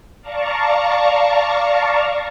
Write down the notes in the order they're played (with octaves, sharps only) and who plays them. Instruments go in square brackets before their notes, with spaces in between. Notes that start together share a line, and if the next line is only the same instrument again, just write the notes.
[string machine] D5 F5 A5 A#5 C#6